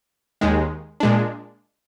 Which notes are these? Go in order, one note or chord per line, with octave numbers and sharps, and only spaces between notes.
D#2 D#3 G#3
A#2 G#3 D4